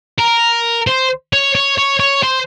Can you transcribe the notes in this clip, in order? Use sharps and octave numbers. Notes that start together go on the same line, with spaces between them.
A#4
C5
C#5
C#5
C#5
C#5
C5